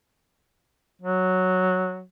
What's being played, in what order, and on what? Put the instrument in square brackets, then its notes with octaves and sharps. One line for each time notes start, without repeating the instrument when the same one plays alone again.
[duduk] F#3